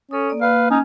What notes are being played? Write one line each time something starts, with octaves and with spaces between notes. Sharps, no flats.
C#4 A4 D#6
A#3 D5
A#3 B4 F5
C#4 D#4